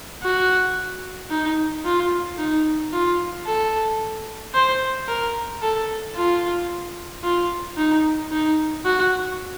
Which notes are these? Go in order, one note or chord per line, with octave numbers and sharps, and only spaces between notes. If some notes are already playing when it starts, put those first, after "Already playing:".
F#4
D#4
F4
D#4
F4
A4
C5
A#4
A4
F4
F4
D#4
D#4
F#4